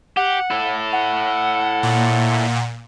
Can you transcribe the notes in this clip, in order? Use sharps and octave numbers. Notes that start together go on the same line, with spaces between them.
G4 F#5
E4 A4
F#5
A#2